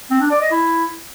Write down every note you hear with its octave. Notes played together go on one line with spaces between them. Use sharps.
C4
D4
D5
D#5
E4